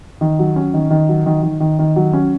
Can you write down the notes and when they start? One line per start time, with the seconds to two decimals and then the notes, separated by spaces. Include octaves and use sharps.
0.21 D#3
0.39 F#3
0.56 C#4
0.74 D#3
0.90 D#3
1.09 F#3
1.26 D#3
1.43 D#3
1.60 D#3
1.79 D#3
1.96 F#3
2.13 C#4